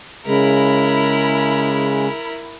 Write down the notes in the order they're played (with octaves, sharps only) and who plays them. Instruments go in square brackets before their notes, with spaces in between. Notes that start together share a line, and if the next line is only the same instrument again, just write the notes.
[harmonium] C#3 G#3 [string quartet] E4 A#4 B5